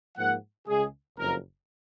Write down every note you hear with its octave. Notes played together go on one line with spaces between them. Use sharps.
G#2 F3 A#3 F#5
C#2 C#3 G#3 G#4
F#1 F2 F3 A#4